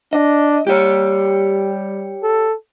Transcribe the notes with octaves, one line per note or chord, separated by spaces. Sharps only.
D4 D#5
G3 G4 C#5
A4